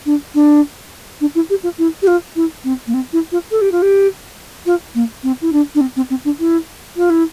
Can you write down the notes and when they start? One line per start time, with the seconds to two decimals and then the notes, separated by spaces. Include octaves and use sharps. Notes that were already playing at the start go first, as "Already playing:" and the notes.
0.06 D4
0.34 D4
1.20 D4
1.35 E4
1.50 G4
1.63 F4
1.78 E4
2.02 G4
2.07 F4
2.36 E4
2.64 C4
2.87 A#3
2.94 C4
3.13 E4
3.32 F4
3.51 A4
3.61 G4
3.71 F4
3.82 G4
4.66 F4
4.94 A#3
5.23 C4
5.41 E4
5.52 D4
5.75 D4
5.81 C4
5.96 C4
6.10 C4
6.24 D4
6.39 E4
6.96 F4
7.10 E4